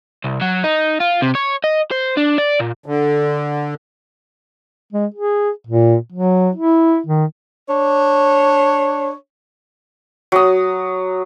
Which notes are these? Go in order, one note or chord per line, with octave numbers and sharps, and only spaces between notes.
C2
F#3
D#4
F4
C3
C#5
D#5
C5
D4
D5
A#2
D3
G#3
G#4
A#2
F#3
E4
D#3
D4 C#5
F#3 D#6